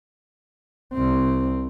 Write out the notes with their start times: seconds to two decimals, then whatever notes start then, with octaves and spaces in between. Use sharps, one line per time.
0.93 C2 C4